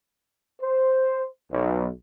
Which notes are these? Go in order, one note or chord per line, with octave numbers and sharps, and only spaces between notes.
C5
B1